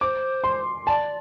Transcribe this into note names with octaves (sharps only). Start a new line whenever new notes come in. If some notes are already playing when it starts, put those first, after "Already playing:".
C5 D6
C6
D5 A5